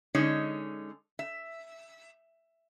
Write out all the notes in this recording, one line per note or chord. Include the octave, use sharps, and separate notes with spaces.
D3 G#3 C#4 D#4 C#5
E5